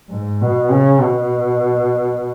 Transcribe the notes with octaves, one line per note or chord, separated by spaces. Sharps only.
G#2
B2
C#3
B2